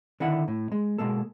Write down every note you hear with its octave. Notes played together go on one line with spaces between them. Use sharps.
D3 D#3 E4 F#5
A2
G#3
B2 G#3 A#3 A4